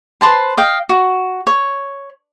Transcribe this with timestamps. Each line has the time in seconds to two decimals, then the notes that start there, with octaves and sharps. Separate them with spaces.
0.21 B4 C5 A5 C6
0.57 D#5 F5 G5
0.89 F#4
1.47 C#5